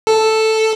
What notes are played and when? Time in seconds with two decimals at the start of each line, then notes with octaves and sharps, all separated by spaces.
0.07 A4